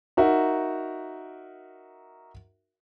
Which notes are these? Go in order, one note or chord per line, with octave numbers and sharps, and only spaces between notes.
D#4 F#4 A#4 E5